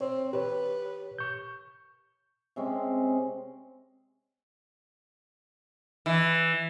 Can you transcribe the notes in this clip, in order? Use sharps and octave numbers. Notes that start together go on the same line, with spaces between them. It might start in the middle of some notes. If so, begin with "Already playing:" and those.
C4 C#5
G4 B4 C#5
C#6 G6
C3 G#3 C4 C#4
E3